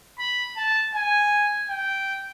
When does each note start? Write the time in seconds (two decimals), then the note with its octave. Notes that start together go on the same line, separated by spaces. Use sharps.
0.19 B5
0.57 A5
0.94 G#5
1.69 G5